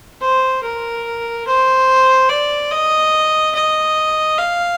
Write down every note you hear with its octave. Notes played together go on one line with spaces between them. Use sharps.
C5
A#4
C5
D5
D#5
D#5
F5